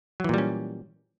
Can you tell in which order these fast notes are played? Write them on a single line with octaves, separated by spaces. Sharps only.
F#3 E3 A#2 G3 C#4